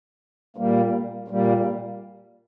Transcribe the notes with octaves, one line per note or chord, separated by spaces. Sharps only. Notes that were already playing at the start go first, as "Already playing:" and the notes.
A#2 G3 A#3
A#2 G3 A#3